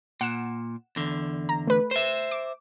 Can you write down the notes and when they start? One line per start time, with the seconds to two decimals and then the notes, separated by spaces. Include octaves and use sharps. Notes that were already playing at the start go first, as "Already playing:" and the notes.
0.21 A#2 F#5 E7
0.96 E2 D3
1.49 A#5
1.67 A3 B4
1.91 C5 E5
2.31 D6